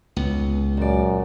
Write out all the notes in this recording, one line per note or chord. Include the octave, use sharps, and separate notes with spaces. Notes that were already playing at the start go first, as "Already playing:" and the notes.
C#2 B3
F#2 A#2 D5